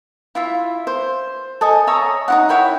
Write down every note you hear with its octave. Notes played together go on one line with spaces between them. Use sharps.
E4 F4 E5
C5
A4 D#5 G#5
C#5 E5 A#5 D#6
D#4 E4 F#5
E4 C#5 G5 B5